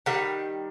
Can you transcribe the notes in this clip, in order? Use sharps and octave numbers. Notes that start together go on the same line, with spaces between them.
D#3 G3 F#5